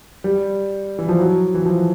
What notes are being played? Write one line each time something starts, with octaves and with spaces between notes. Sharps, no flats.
G3
E3
F3
F#3
E3
F3